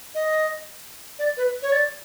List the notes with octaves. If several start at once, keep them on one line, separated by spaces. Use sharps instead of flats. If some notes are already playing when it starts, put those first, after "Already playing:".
D#5
D5
B4
C#5
D5